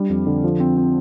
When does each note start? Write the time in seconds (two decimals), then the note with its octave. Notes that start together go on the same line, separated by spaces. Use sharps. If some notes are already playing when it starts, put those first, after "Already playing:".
Already playing: G3 D4
0.10 F2
0.27 D3
0.44 F3
0.60 C4
0.77 C4